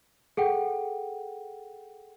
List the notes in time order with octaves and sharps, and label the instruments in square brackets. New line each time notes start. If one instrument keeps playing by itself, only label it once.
[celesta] G#4 A4 F#5 G5